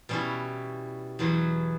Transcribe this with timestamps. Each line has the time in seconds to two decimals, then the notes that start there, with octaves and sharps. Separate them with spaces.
0.09 B2 G3 C#4 E4
1.19 E2 B2 F#3 B3 E4